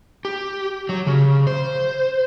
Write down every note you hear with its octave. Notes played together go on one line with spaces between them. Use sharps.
G4
F#3
C#3
C5